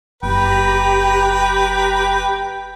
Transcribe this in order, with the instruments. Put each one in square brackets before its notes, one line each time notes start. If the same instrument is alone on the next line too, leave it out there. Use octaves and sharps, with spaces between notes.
[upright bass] F#1 [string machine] G4 A#5 B5 [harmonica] B4 [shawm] G5